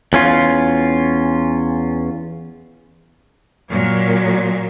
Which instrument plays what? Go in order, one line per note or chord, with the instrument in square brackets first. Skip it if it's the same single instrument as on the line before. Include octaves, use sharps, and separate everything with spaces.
[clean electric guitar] E2 C#4 F4
[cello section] A#2 F#3